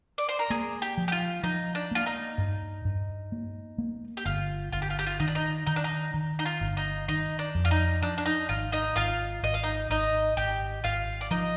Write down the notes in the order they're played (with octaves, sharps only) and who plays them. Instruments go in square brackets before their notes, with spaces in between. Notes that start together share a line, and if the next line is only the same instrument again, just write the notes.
[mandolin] D5
C5
A#4
[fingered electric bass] A#3 [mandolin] G#4
[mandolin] G4
[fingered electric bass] F3
[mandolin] G4
F4
[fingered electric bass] F3 [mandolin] D#4
[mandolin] D4
[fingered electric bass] A#3 [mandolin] F4
[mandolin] D#4
[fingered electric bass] G2
G2
A#3
A#3
[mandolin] G4
[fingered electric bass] G1 [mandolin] F4
[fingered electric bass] G1 [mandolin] F4
[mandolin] G4
F4
G4
F4
[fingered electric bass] D#3 [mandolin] D#4
[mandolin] D4
D#4
[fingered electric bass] D#3 [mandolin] D#4
[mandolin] D4
D#4
[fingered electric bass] D#3
[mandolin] D#4
F4
[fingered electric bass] G1
[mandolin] D#4
[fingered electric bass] D#3 [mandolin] D#4
[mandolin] D4
[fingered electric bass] F2
[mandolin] F4
D#4
[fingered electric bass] F3 [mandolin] D4
[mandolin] D4
D#4
[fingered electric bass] G#1 [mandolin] F4
[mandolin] D#4 D#5
[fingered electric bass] G#1 [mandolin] F4 F5
[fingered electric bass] G#1 [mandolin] D#5
[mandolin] F5
D#4 D#5
[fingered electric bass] G#1 [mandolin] D#4 D#5
[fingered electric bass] G#1 [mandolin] G4 G5
[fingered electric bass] G#1 [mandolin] F4 F5
[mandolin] D5
[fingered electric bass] F3 [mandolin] D#4 D#5